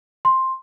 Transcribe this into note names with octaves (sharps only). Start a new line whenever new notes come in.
C6